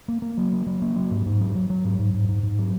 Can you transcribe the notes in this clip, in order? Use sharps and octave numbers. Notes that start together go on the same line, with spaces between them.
A#3
A#3
F#3
A#3
F#3
A#3
F#3
G#2
G#2
F#3
F#3
F#3
G#2
G#2
G#2
G#2
G#2
F#3